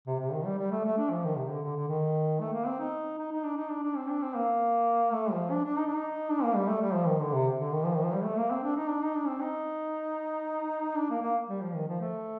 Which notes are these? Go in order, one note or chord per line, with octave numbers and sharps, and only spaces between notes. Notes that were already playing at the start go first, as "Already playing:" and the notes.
C3
C3
D#3
G3
G3
A3
A3
D4
F3
D#3
C3
D3
D3
D3
D#3
A3
A#3
C4
D#4
D#4
D#4
D4
D#4
D4
D4
C4
D4
C4
A#3
A3
F3
D4
D4
D#4
D4
D#4
D4
A#3
G3
A3
G3
F3
D#3
D3
C3
D3
D#3
F3
D#3
F3
G3
A3
A#3
C4
D4
D#4
D4
D#4
D4
C4
D#4
D4
A#3
A#3
G3
F3
D#3
F3
A3